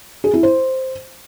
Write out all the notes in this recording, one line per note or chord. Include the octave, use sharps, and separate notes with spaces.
G#4
E4
C5